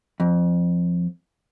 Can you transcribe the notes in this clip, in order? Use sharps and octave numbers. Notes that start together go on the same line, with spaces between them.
F2